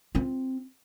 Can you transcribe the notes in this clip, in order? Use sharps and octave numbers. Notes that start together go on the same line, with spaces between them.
C4 F4